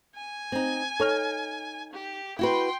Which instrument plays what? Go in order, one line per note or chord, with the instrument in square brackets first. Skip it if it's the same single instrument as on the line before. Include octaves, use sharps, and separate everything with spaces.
[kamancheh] G#5
[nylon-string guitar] C4 D#4
[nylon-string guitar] D#4 [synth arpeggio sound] A4 C#5 F6
[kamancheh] G4
[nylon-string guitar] E4 F#4 B4 [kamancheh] G5 C6